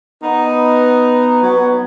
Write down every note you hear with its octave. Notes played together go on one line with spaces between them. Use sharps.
B3 D#4
F#3 B3